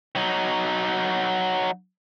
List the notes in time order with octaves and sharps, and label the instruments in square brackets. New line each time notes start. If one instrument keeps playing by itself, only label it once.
[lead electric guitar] F#3 D#4